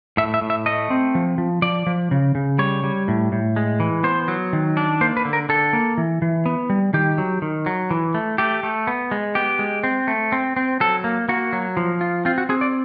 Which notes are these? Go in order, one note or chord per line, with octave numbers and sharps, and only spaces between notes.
A2 E5
E5
A2
E5
A3 D#5
C4
F3
F3
F3 D5
F3
C#3
C#3
G3 C#5
G3
A2
A2
G#3
E3
B3 C5
F#3
D#3
D4
A#3 C5
B4
D3
A#4
D3 A4
A#3
E3
E3
B3
G3
D#3 G4
F#3
D#3
F#3
E3
A3
A3 G4
A3
B3
G#3
B3 G4
G#3
C4
A3
C4
C4
F#3 A4
A#3
A#3 F#4
F#3
F3
F4
C4 F4
F#4
C4 G#4
D5